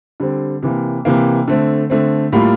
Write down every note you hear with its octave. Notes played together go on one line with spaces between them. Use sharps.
D3 G3 C4
C3 E3 A#3
C3 E3 A#3
D3 A3 C4
D3 A3 C4
A2 G3 A#3 F4